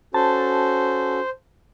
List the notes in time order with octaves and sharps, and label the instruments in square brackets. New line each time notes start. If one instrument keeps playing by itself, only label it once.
[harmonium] C#4 F#4 A4 [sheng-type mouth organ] C5 [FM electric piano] A5